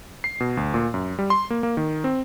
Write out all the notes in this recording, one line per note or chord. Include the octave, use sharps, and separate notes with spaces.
C7
B2
D2
A#2
F#2
G3
C6
A#3
A#3
D#3
C4